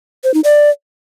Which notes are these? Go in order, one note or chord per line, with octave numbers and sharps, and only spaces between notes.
C5
D#4
D5